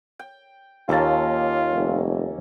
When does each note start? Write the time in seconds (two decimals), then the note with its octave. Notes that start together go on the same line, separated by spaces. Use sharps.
0.19 G5
0.89 D#2 A#3 C#4 F4 A4 A5
1.71 F1